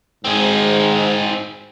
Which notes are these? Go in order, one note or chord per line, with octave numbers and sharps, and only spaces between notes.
G#2 C4 G#4